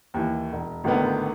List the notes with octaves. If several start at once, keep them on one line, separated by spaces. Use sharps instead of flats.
D#2 E3
E1
G#1 A2 D3 D#3 B3